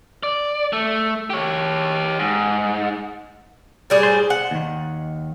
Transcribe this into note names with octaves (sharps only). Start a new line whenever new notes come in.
D5
A3
G4 C#5
G#2
A2 G3 G#4
C5
F#5
D#2 D#3